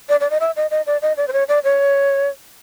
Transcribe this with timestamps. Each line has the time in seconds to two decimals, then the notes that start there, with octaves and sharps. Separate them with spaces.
0.09 D5
0.20 D5
0.30 D#5
0.40 E5
0.56 D#5
0.71 D#5
0.86 D5
1.02 D#5
1.17 D5
1.27 C5
1.33 C#5
1.48 D5
1.64 C#5